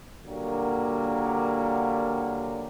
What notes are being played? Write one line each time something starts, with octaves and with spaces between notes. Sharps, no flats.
A#2 D3 F#3 G3 A#3